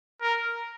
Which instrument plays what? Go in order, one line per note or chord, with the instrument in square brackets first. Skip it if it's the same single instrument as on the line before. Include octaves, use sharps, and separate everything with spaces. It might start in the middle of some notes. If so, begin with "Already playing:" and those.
[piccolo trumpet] A#4